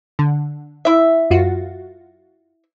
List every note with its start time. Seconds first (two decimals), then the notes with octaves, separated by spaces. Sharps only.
0.19 D3
0.85 E4 E5
1.30 F#2 F4 F#4